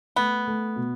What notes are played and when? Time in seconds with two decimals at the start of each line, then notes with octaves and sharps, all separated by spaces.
0.16 A3 B3
0.47 A3
0.76 B2